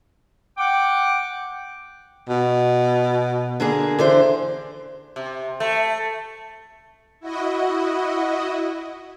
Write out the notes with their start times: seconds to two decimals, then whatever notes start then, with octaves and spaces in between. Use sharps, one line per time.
0.58 F#5 G5 D6
2.29 B2
3.60 D3 A#3 G#4
3.99 D3 E3 C5
5.16 C3
5.60 A3
7.20 E4 F#4 D#5